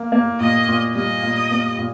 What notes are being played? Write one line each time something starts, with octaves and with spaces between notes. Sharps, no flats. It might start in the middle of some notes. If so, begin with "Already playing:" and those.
Already playing: A#3
A#3
A#2 D#5
A#2
G3 D#5
A#2
A#3
A#2